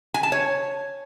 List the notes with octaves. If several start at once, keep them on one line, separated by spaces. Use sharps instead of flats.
G#5
A5
C#5